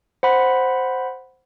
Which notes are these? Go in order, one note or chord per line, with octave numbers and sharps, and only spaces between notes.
C5 F#5 B5